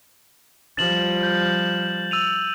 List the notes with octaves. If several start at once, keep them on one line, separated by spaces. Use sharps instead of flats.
F3 G3 A6 E7 F#7
G6
E6 D#7 F7